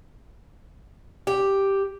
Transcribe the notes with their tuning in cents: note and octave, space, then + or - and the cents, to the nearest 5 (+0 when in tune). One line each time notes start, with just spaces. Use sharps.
G4 +0